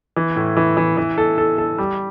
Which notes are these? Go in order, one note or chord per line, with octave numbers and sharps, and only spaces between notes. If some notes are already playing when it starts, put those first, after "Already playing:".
E3
A2
E3
E3
E3
A4
A4
A4
G3